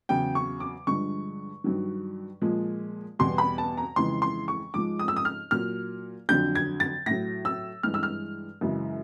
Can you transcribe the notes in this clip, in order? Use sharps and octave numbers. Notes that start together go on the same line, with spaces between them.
E2 C#3 F#3 G5
C#6
D6
G2 D3 F3 G#3 C#6
G2 D#3 F#3
A#2 F3 G#3
E2 B2 G3 C6
B5
A5
A#5
F2 C#3 E3 G#3 C6
C6
C#6
G#2 F3 G#3 D6
D#6
E6
D#6
F6
A#2 F#3 F6
F2 D3 F#3 G6
G#6
A6
A2 F#3 A#6
E6
G2 E3 G#3 F6
E6
F6
F#2 C#3 E3 G#3